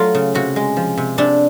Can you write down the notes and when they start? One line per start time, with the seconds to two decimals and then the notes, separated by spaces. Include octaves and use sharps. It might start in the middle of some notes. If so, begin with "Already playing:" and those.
Already playing: F#3 A3 F4
0.15 C#3
0.35 C3 F#4
0.56 G#3
0.77 F3
0.98 C3
1.18 C3 D4